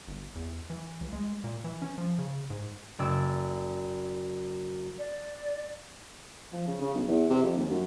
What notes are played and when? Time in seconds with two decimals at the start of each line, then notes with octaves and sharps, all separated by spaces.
0.08 G1
0.35 E2
0.70 E3
1.01 C#2
1.13 G#3
1.44 A#2
1.64 E3
1.82 C#4
1.98 F3
2.18 C#3
2.50 G#2
2.99 F#1 D5 E6
4.99 D5
6.53 F3
6.67 C#3
6.81 C#3
6.94 B1
7.08 E2
7.30 C3
7.43 F2
7.56 D#2
7.70 F#2